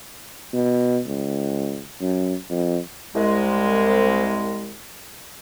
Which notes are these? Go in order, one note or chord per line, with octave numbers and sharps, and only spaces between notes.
B2
C#2
F#2
F2
C2 G#3